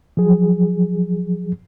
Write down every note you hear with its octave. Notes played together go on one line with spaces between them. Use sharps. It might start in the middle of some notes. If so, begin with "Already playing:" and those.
F3 F#3 G#4